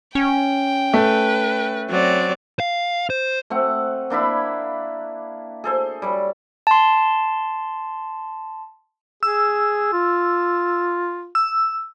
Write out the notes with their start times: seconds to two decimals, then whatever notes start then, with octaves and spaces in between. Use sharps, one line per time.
0.15 C#4 G5
0.94 A3 B4
1.90 F#3 C4 D5
2.60 F5
3.10 C5
3.50 A3 C4 F#5
4.10 A#3 D4 E4 B5
5.64 G#4 A4 C5
6.02 G3 C#5
6.67 A5 C6
9.23 G#4 E6
9.92 F4
11.35 E6